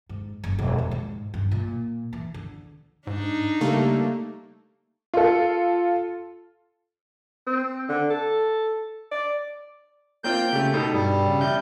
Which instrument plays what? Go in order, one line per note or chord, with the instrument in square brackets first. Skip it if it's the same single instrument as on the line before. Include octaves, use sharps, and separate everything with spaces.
[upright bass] G#2
F#1
E1
E3
G#2
G2
A#2
E3
D3
[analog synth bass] G#2 [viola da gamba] D4 D#4
[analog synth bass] C#3 [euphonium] G3 [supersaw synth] A3 A#3
[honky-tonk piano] F4 A4
[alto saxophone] C4
D3
A4
D5
[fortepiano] A#3 C4 F4 [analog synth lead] G5 [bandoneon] G6
[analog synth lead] C#3 [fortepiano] A3 G4
[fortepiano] B2 A4 [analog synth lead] D#4
[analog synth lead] G2 [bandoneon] G3
[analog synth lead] C#3
[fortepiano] A1 [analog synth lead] G6